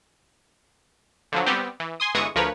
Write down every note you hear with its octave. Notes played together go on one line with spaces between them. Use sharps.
D3 F3 F#3
G3 B3 C4 G4
E3
G#5 C6 D#6
G1 E3 G#3 C#6 D#6
D2 F3 A#4 B4 C#5